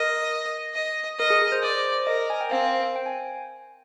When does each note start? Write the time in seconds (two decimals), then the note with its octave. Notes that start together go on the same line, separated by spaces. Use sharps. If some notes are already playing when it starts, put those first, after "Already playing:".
Already playing: A#4 D#5
0.74 D#5
1.19 A#4 D#5
1.30 G#4
1.42 G#4
1.52 C5
1.63 C5 D5
2.07 A#4 D#5
2.30 G#5
2.41 G5
2.51 C4 F5
2.96 G5
3.06 G#5